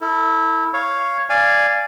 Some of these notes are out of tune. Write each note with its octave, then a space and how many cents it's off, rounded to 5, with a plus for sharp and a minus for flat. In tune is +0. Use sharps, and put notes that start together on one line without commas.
E4 -20 A4 +35
C#5 +0 F5 +0
D5 +0 F5 -15 G#5 +0